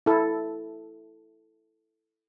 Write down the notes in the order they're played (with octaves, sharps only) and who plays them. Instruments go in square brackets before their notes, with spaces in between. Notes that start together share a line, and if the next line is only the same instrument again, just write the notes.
[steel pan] E4 A4